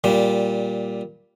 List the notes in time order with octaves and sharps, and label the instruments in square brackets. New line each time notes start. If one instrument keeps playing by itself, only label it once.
[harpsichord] A#2 G3